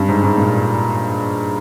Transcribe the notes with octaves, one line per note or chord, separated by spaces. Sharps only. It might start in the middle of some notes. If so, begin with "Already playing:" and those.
Already playing: G2
G#2
G#2
A#2